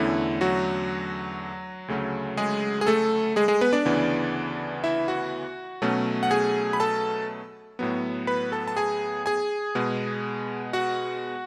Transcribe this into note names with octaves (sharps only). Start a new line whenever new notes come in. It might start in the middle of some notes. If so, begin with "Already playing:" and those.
Already playing: E2 D3 A3 C#4 E4
F#3 F#4
D2 C#3 F#3 A3 C#4
G#3 G#4
G#4
A3 A4
G#3 G#4
G#3 G#4
B3 B4
D4 D5
D2 C#3 E3 B3
E4 E5
F#4 F#5
B2 F#3 A3 C#4
F#5
G#4 G#5
B5
A4 A5
A2 F#3 B3
B4 B5
A4 A5
A5
G#4 G#5
G#4 G#5
B2 G#3 B3
F#4 F#5